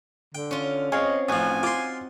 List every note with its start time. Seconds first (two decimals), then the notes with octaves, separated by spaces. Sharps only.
0.35 D3 G5
0.51 C#4 F4
0.92 C4 G#4 C#5 D#5 F5
1.29 A1 F3 D#4 F#4 G#5
1.63 F4 G5 C6 D6